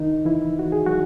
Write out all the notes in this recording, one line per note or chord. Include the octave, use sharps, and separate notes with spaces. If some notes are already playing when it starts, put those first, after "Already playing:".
Already playing: D#3 D#4
E3 E4
F#4
G#4
F#3 F#4